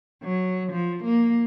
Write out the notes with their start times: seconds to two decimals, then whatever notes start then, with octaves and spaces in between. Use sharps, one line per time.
0.23 F#3
0.72 F3
1.04 A#3